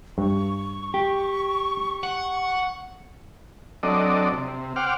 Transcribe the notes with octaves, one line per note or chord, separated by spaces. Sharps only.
G2 C#6
G4
F#5
F#3 C4 D4 A4 D5 D#5
C3
C5 F#5 G5 D6 F6